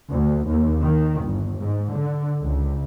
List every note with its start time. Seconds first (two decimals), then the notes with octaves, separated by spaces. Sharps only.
0.11 D2
0.48 D#2
0.83 D#3
1.23 G1
1.59 G#2
1.93 D3
2.42 C#2